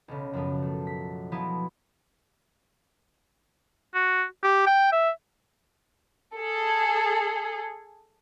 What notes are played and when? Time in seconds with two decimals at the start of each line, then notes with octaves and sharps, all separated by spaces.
0.08 B1 C#3
0.33 F#2 F3 B3
0.62 A3
0.87 B6
1.32 F3 F#3 B3 E4 B4
3.94 F#4
4.43 G4
4.67 G5
4.92 E5
6.35 G#4 A4